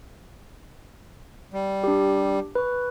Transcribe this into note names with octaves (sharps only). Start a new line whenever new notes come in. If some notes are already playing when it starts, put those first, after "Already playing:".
G3
D4 G4
B4 C#6